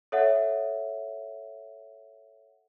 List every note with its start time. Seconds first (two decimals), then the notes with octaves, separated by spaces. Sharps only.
0.12 A4 C#5 E5 F#5